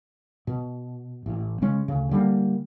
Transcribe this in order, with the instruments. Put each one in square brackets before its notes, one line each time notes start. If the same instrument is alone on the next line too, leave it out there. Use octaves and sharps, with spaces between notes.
[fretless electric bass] B2
A1
C#3 G#3 C#4
D2 C#3
D3 G3 A3 A#3